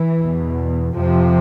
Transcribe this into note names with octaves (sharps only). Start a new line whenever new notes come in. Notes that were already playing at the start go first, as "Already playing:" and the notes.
Already playing: E3
E2 B2
F2 C3 F3